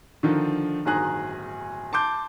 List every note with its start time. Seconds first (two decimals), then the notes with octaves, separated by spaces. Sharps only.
0.23 D3 D#3 F3
0.85 D1 G1 D#3 G#4 A#5 F#6
1.93 A5 C6 D6 G6